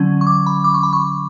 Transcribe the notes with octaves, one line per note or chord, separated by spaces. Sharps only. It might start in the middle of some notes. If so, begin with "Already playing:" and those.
Already playing: D3 F#3 C#4
C#6
D6
B5
D6
C#6
B5
C#6